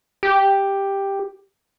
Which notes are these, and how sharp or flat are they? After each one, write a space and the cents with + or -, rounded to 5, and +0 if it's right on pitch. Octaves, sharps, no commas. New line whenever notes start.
G4 +5